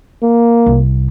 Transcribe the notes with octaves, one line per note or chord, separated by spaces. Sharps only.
A#3
C2